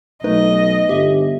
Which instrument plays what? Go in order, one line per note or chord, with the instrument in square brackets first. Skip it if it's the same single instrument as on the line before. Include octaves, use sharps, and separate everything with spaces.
[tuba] B1 [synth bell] A3 D#4 B4 [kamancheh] D#5
[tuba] G1 [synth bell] G4 E5